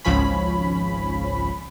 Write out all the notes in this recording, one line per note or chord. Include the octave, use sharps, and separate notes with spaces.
G#1 C#2 F3 C#4 B5